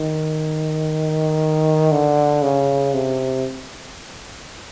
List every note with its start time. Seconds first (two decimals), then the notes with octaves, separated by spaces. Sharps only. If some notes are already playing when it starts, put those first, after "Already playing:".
Already playing: D#3
1.91 D3
2.42 C#3
2.94 C3